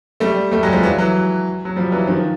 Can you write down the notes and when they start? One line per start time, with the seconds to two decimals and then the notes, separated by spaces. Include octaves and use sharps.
0.20 G3 A3
0.52 G3 A3
0.63 F#3 G#3
0.73 F3 G3
0.83 E3 F#3
0.98 E3 F#3
1.65 F#3
1.76 F3 G3
1.92 E3 F#3
2.07 D#3 F3